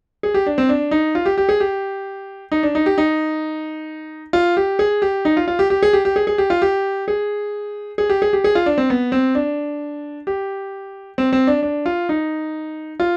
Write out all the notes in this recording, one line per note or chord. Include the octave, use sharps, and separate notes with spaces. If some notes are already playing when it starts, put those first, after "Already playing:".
G#4
G4
D4
C4
D4
D#4
F4
G4
G4
G#4
G4
D#4
D4
D#4
G4
D#4
F4
G4
G#4
G4
D#4
F4
F4
G4
G4
G#4
G4
G4
G#4
G#4
G4
F4
G4
G#4
G#4
G4
G#4
G4
G#4
F4
D4
C4
B3
C4
D4
G4
C4
C4
D4
D4
F4
D#4
F4